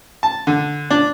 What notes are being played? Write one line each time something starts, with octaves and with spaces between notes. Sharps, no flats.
A5
D3
D4